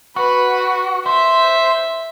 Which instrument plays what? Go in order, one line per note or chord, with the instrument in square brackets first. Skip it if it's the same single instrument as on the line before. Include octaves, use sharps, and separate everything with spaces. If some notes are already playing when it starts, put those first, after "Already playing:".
[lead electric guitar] F#4 [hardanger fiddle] B4
[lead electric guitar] C5 [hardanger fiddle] E5